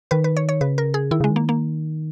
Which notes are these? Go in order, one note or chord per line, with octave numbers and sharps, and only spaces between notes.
D#3 B4
B4
C#5
C#5
C#3 B4
A#4
G#4
D#3 E4
C#3 G#3
D#3
A#3
A#3